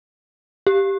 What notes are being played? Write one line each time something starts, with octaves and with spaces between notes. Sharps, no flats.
G4